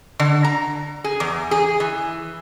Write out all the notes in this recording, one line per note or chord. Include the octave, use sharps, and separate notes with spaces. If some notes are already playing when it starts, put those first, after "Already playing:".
D3
A#5
G#4
E2
G#4
E3